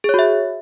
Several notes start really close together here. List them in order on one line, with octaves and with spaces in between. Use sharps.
G#4 C#5 F#4 E5